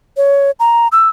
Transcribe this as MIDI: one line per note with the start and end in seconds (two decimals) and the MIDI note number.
0.17 0.51 73
0.60 0.88 82
0.92 1.09 88